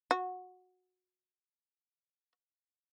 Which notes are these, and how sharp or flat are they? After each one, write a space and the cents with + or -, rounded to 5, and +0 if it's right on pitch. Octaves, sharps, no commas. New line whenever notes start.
F#4 -15